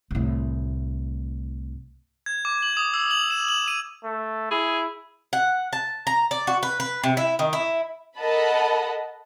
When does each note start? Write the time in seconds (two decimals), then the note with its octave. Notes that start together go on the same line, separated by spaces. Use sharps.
0.11 C2 A2
2.26 G#6
2.45 D6
2.63 F#7
2.77 D#6
2.94 E6
3.11 F#7
3.30 E7
3.48 F#7
3.68 D#7
4.04 A3
4.51 E4 G#4
5.33 F#5
5.73 A5
6.07 A#5
6.31 D5
6.47 F#4
6.63 B4
6.80 B4
7.04 C3
7.17 E4
7.39 D#3
7.53 E4
8.17 A4 A#4 D#5 F#5 A5 B5